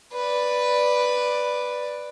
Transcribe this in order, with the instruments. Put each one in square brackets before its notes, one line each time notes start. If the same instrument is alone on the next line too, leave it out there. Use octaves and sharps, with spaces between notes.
[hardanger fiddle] B4 D5